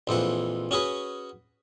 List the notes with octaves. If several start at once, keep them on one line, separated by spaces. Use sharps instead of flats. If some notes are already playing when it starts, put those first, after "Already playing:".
A#1 F2 E3 F#5
C#4 F#4 G#4 B4